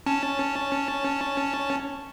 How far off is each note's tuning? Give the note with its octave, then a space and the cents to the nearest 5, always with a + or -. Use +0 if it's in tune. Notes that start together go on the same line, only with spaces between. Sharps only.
C#4 +0 A5 +0